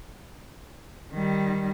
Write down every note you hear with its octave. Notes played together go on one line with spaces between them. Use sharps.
D#3 G3